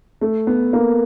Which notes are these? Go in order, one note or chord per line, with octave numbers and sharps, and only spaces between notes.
A3
B3
A#3